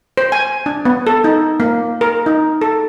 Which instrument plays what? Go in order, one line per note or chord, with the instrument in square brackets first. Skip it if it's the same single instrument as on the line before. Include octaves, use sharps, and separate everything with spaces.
[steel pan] C5
G#5
D4
B3
A4
D#4
A#3
A#4
D#4
A4